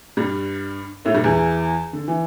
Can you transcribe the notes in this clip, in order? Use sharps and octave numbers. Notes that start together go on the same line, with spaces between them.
G2 G3
A2 A3
G2 G3
E2 E3
D3
E3